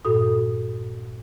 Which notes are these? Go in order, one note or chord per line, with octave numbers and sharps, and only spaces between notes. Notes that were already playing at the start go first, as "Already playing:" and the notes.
G2 A#2 F#4 A4 D#6